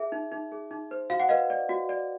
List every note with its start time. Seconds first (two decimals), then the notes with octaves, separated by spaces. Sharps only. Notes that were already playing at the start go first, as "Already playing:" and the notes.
Already playing: G#4 E5
0.12 D#4
0.32 D#4
0.52 G#4
0.71 D#4
0.91 C5
1.10 F#4 F5
1.20 F#5
1.29 B4 D#5 F5
1.50 D5
1.69 F#4
1.89 D5